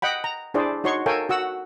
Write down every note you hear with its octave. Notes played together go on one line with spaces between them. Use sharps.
D#5 F#5 G5 B5
A#5
D4 E4 G#4 C5 D5
D#4 F#4 C#5 C6 C#6
A4 A#4 C#5 F5 G5 G#5
F#4 F#5 E6